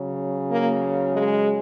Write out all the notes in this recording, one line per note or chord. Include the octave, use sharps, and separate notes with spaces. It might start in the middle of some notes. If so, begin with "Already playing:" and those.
Already playing: C#3 F#3
A#3
G#3